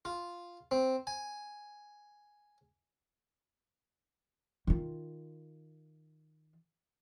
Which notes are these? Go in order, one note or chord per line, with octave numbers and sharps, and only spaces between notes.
F4
C4
G#5
D#3 F4